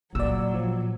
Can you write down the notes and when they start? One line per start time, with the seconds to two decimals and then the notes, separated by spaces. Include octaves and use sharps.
0.15 A#2 F#3 D5 E6
0.54 F3